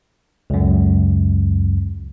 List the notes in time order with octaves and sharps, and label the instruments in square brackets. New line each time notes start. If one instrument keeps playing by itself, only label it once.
[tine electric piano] C#2 F#2